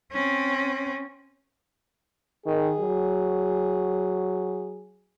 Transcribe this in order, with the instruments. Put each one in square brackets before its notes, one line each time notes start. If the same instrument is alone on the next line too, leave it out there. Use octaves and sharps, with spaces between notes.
[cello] C4 C#4
[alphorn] D#3 [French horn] G#4
[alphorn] F#3